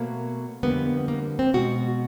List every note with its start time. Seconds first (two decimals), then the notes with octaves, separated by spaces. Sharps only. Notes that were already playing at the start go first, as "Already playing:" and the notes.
Already playing: B2 F#3 A3 A#3
0.63 F2 D3 G3 A#3 B3
1.08 A#3
1.39 C4
1.54 B2 G#3 F#4